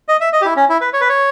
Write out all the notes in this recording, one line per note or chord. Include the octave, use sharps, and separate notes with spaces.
D#5
E5
D#5
G4
E4
C#4
E4
B4
C#5
B4
C#5